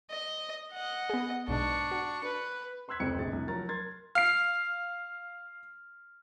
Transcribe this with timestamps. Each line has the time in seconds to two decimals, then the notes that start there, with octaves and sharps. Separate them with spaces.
0.11 D#5
0.72 D#5 F#5
1.10 B3 G#4
1.48 B1 G#2 B2 D4 C#6
1.91 F#4
2.24 B4
2.88 B4 C6 E6 F#6 G#6 B6
3.00 F1 C#2 C4 C#7
3.18 F1 A#1 G#4 A6
3.32 C2
3.48 F3 F#3 A#4 A#5 A6
3.69 A#4 C6 G#6 A6
4.15 F5 F6 C7